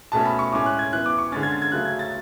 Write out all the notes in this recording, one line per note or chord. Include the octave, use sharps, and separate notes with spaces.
B2 A3 C#4 A5
B5
C#6
A2 G#3 C#4 D6
F#6
G#6
E3 B3 F#6
D6
C#6
D3 G#3 C#4 A6
G#6
A6
G#6
C#3 F#3 A3 F#6
G#6
A6